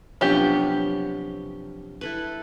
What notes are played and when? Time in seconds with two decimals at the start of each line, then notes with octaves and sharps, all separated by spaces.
0.21 C3 F3 F#3 B3 C#4 D4 G4
2.01 E4 A4 B4